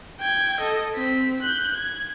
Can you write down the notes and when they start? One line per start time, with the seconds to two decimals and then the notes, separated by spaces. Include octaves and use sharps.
0.20 G5 G#6
0.60 A4 D#5
0.96 C4 B6
1.42 F#6 G6
1.77 G#6